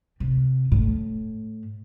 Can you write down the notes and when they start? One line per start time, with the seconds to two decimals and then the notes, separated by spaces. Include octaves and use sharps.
0.20 C3
0.72 A2